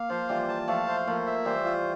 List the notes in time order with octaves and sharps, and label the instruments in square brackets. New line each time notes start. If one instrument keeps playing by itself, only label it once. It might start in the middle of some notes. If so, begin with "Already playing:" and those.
Already playing: [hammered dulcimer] A#3 [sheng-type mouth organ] F5
[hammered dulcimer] F3 [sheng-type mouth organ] C5
[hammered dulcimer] E3 G3 [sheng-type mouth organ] F4
[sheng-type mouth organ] A5
[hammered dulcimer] F3 A3 [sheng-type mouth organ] F5
[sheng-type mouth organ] C5
[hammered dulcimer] F3 A3 [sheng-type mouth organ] A#3
[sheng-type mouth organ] E5
[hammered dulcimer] E3 G3 [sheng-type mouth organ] C5
[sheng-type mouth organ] F4